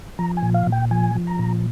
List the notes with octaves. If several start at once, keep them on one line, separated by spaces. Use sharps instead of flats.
F3 A#5
G#5
A#2
F5
A#2
G5
F3 G#5
F3
A#5
A#2